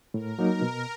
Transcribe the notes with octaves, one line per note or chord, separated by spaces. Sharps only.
A2 A#4
F#3 A#3 D#4
B2